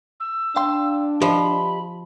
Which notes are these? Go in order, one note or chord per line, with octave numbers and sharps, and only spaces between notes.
E6
D4 F5 G5 C6
F3 G4 D#5 B5